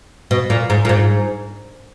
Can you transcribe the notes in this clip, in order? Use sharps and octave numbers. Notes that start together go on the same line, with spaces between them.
B2
A#2
G#2
A#2
G#2